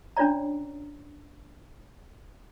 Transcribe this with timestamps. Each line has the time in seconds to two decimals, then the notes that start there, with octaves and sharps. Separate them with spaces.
0.17 C#4 D4 F4 C#5 D5 A#5